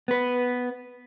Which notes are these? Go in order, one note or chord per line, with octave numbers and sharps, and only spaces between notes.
B3 B4